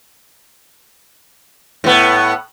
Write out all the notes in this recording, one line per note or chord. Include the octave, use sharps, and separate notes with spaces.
A2 B3